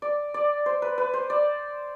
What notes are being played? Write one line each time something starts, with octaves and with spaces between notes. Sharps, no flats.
D5
D5
C5
B4
B4
C5
D5